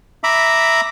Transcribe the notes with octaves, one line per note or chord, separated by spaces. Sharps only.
E5 A#5 B5 D6